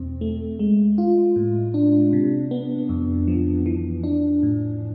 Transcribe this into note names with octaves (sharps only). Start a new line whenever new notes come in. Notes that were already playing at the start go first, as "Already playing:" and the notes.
Already playing: E2 B2 C4
A3
G#3
F4
A2
D4
C3
B3
F2
F3
E3
D4
A2